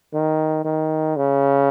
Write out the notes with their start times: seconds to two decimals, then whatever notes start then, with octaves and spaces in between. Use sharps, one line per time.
0.14 D#3
0.65 D#3
1.16 C#3